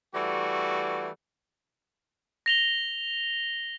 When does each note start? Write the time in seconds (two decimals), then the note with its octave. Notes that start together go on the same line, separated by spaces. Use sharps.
0.15 E3 G3 A3 F#4
2.46 A#6 F7 G7